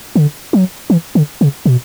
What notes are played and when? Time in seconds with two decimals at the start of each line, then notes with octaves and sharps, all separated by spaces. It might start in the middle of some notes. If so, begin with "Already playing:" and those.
0.16 D3
0.53 F#3
0.90 E3
1.15 D3
1.41 C#3
1.66 B2